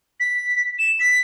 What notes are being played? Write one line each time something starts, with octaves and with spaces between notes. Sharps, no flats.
B6
E7
B6